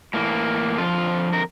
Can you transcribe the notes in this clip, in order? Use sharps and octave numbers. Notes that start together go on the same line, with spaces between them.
A2 E3 A#3
F2 D3 F3 F4
A#4